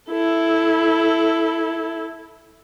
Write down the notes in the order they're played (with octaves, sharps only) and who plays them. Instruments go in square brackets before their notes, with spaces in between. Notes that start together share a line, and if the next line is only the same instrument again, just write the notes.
[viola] E4 A4